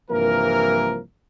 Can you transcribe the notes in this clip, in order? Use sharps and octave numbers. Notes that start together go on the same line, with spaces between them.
C2 G2 E3 F3 A#3 A#4